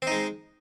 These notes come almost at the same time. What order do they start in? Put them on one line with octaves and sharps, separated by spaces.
C4 D#4 G#3